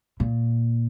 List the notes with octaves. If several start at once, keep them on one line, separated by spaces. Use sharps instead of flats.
A#2